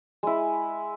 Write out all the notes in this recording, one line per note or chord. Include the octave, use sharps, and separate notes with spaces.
G#3 E4